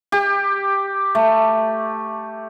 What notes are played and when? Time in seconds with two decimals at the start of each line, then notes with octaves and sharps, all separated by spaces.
0.12 G4
1.15 A3